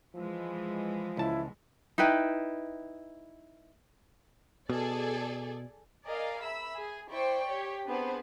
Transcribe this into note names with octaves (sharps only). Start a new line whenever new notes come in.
E3 F3 G#3
C#2 E4 A5
D#4 E4 B4 G5
B2 G#4 A4 D5
G#4 A#4 D5 D#5 F5
E5 B5 E6
G#4
E4 C5 D5 G5 C#6
G4 C#5
B3 C4 D4 G#4 B4 C5